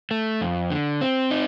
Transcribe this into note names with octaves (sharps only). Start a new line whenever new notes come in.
A3
F2
D3
C4
D#4